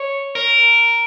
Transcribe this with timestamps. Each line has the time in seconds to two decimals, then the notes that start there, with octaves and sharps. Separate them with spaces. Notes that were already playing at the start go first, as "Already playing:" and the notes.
Already playing: C#5
0.35 A#4